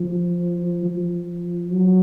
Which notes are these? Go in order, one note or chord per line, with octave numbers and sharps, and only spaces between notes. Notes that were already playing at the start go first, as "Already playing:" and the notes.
Already playing: F3
F3
F#3